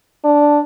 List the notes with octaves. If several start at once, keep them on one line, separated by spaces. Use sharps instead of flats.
D4